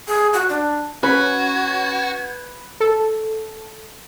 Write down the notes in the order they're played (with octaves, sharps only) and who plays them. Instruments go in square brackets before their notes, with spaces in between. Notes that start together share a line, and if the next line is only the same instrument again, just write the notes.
[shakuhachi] G#4
F#4
D4
[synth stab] C#4 [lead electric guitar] F#4 [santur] B4 [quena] G#6
[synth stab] A4